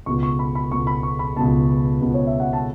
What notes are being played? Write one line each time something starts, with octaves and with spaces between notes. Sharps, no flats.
C#2 B2 B3 C#6
C#6
B5
B5
C#2 B2 B3 C#6
B5
C#6
B5
C#2 B2 B3 A5
C#2 B2 B3
C#5
E5
F#5
A5